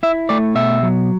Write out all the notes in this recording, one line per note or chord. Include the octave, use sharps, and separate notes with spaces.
E4 E5
A3 D5
B2 E5
F#3